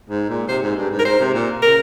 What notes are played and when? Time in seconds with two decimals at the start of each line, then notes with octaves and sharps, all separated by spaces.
0.10 G#2
0.30 A#2
0.48 C3 C5
0.62 G#2
0.77 G2
0.91 G#2
0.99 A#4
1.05 G#2 C5
1.20 C3
1.34 A#2
1.62 C#3 A#4